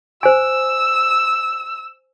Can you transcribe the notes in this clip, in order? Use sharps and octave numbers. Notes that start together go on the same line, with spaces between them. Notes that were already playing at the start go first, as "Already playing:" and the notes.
C5 G#5 E6